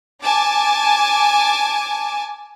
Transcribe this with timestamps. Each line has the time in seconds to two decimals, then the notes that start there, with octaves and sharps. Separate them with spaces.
0.20 G#5 A5 D6